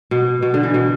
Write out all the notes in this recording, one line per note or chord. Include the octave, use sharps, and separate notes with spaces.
B2
B2
D3
E3
B2